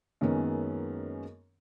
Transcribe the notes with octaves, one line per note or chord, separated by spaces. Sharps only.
F#2 D#3 G#3 A#3 B3 C#4